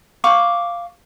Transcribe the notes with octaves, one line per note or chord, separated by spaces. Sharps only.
F5 C#6 D6